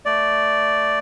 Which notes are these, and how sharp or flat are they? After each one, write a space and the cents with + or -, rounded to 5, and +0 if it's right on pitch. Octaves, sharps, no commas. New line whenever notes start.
A3 +0 D5 +0